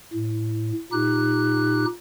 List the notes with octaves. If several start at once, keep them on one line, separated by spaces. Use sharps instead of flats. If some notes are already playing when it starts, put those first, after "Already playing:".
A2
A#2 D#4 G4 F#6